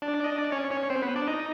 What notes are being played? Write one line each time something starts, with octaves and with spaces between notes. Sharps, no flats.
D4 D5
D#5
D5
C#4 C#5
C#4 C#5
C4 C5
B3 B4
D4 D5
D#4 D#5